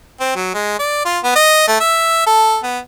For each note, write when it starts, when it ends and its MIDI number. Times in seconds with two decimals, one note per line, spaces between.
0.20 0.34 60
0.36 0.49 54
0.54 0.79 56
0.79 1.05 74
1.05 1.18 65
1.24 1.32 59
1.36 1.64 75
1.68 1.77 57
1.80 2.24 76
2.27 2.58 69
2.63 2.79 59